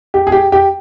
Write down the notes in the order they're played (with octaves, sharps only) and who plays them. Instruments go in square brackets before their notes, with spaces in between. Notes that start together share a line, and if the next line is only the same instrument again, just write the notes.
[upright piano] G4
G#4
G4
G4